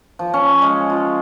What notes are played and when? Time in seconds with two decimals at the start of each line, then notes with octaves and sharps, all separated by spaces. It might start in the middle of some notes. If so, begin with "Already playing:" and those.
0.19 F3
0.34 C#4
0.62 G#3
0.90 F4